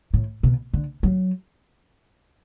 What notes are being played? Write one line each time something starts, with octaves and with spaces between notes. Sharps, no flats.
A2
B2
D3
F#3